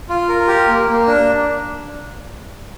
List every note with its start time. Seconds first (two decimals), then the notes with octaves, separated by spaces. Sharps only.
0.09 F4
0.29 A#4
0.47 G4
0.67 A#3
0.88 A#3
1.07 D4